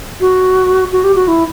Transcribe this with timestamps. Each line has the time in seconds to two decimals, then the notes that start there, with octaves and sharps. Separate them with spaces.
0.21 F#4
0.92 F#4
1.04 G4
1.15 F#4
1.28 E4